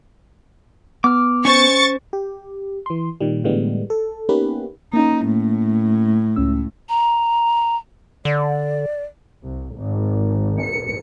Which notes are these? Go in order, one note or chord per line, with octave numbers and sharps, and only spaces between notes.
B3 D6 F6
C#4 C5 C#6 A6 C#7
G4
E3 C6
A#2 D#3 G3
A2 D3 E3 G3 G#3 B3
A4
A#3 B3 C#4 D#4 G4 B4
A#3 C#4 D#4
A2
C#2 C#4 E6
A#5
D3 D5
C2
G#1
C#7